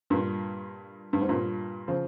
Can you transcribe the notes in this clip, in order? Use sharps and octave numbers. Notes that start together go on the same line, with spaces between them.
G2 A#2
G2
G#2
G2 A#2
C#3 F3